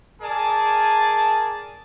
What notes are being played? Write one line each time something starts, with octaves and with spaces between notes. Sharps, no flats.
G#4 A#4 D5 G#5 A5